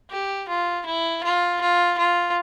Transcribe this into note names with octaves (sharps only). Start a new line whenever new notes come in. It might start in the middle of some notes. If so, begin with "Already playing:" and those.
G4
F4
E4
F4
F4
F4